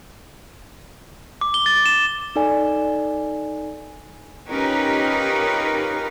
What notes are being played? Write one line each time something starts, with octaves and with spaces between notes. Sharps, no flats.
D6
G7
A6
E7
D#4 A4 D5 G#5
C#4 D#4 F4 G4 A#4 B4